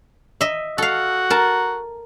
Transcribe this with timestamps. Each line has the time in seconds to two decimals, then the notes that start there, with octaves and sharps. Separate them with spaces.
0.41 D#5 E5
0.78 F#4 A4 F5
1.30 A#4 A5